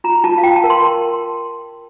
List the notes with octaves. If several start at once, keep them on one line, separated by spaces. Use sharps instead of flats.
F4 A#5
F4 A5
F5
F4 G5
A5
A#4
C6